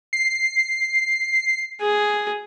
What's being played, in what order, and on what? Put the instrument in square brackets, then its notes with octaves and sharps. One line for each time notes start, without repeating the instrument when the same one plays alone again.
[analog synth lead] C7
[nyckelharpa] G#4